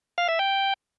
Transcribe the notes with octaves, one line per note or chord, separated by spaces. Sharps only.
F5
E5
G5